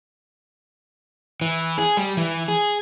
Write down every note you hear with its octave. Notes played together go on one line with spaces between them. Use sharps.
E3
G#4
G3
E3
G#4